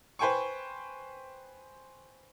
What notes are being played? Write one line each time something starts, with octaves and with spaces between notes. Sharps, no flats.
B4 C5 G5 G#5 C#6